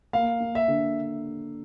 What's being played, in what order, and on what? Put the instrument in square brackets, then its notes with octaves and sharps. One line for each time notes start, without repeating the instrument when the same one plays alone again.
[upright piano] A#3 [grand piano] F5
[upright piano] A#3
[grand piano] E5
[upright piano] D3